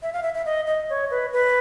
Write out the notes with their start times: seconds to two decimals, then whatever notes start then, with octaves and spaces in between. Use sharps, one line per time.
0.02 E5
0.13 F5
0.23 E5
0.34 E5
0.46 D#5
0.67 D#5
0.90 C#5
1.11 B4
1.33 B4